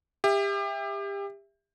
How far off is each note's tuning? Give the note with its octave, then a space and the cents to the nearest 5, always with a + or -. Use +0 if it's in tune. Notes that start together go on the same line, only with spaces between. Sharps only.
G4 +30 E5 +0